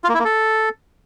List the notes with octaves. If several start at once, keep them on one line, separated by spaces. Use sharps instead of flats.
F4
A#3
E4
A#3
A4